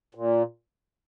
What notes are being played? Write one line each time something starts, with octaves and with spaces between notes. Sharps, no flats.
A#2